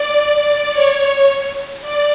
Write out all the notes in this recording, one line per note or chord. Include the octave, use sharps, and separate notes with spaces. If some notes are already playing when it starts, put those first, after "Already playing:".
Already playing: D5
C#5
D5